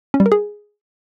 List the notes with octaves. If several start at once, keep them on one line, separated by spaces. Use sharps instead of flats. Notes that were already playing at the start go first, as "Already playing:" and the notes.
C#4
G3
A#4
G#4